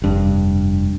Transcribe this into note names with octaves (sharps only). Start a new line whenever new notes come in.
F1 G2